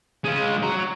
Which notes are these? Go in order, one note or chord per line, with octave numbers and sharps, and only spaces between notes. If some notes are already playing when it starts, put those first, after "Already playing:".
G#3 F4
F#4 A#5